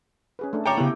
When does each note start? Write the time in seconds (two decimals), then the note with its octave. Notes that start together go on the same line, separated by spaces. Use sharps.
0.39 C#4 G#4 B4
0.53 A3 D4
0.66 A4 C#5 G5 A#5 D6
0.77 C#3 B3 E4 G4